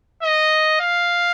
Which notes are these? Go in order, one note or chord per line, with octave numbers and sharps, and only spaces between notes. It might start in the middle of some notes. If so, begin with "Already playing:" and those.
D#5
F5